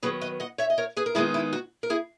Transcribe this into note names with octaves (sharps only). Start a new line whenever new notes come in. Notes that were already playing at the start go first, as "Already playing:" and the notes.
D#3 F#3 B3 G#4 B4
B4 D#5
D#5 F#5
C#5 E5
D#5
A#4 C#5
G#4 B4
A#4
D#3 G#3 B3 D#4 E4 G#4
E4
F#4
A#4
E4 G#4